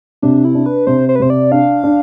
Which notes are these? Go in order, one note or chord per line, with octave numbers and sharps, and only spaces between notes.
C3 D4
E4
D4
B4
C3 C5
C5
B4
C3 C5
D5
D4 F5
D4